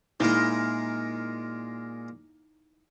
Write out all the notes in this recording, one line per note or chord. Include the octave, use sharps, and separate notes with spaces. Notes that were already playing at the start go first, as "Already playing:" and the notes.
A#2 G#3 D#4 E4 A#4 C6